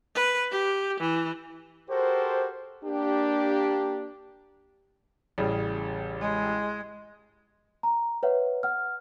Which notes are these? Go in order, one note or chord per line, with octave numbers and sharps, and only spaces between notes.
B4
G4
E3
F#4 G4 A4 A#4 C5
A#3 D4 G4
A1 C#3 G3
G#3
A#5
B4 C#5 E5 F#5
F#5 F6